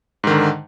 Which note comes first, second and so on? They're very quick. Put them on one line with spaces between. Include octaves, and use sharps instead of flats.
G#2 D#3 D3